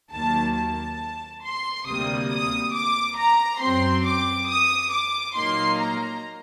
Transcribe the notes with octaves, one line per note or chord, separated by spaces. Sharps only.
D#2 D#3 F#3 A#3 A5
A5
C6
D2 C3 G3 A#3 D#6
D#6
D6
A#5
F#2 F#3 C4 C6
D6
D#6
D6
A#2 F#3 A#3 D#4 C6
A#5